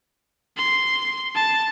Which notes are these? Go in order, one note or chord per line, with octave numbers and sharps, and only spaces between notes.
C6
A5